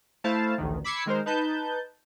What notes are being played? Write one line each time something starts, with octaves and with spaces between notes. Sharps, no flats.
A3 E4 C5 F5 A5
A1 D2 D#3
B5 D6 E6 G#6 C7 C#7
D#3 G#3 A#4 C5
D#4 B4 A5 G6